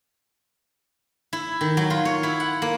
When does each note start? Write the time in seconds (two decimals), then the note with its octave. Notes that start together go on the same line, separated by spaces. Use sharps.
1.33 E4
1.61 D#3
1.77 F#3
1.90 F4
2.05 C#5
2.23 E4
2.40 F#5
2.62 A#3